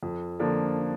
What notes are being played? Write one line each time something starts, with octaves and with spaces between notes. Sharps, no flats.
F2
D3 F3 A#3 D4